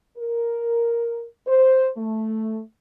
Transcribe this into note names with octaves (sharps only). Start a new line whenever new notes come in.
A#4
C5
A3